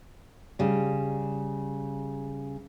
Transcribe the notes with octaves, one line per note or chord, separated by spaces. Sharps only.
C#3 G3